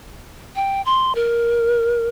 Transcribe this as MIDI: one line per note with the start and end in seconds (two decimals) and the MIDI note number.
0.56 0.81 79
0.86 1.15 84
1.15 2.09 70